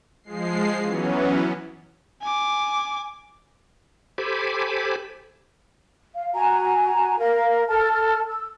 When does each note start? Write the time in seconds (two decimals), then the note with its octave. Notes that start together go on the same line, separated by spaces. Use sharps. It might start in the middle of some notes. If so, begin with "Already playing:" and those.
0.23 F3 G#3 C7
0.82 E3 F#3 B3 C#4
2.22 G#5 D6
4.18 G4 A4 C5 G#5 B5 D6
6.15 F5
6.35 F#4 G#5 A#5
7.19 A#4 F5
7.68 A4 A5 F6
8.27 E6